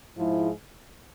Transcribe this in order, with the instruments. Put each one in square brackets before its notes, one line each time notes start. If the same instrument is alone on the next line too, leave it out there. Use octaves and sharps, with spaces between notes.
[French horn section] G#2 F3 G#3 E4